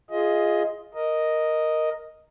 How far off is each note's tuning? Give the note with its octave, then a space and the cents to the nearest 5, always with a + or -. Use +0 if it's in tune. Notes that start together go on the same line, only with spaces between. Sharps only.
F4 -5 G#4 +0 D#5 +15
A#4 +0 D#5 +0